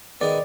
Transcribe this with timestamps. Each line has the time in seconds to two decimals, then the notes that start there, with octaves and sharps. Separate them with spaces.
0.21 D#3 G#3 B3 D#4 D5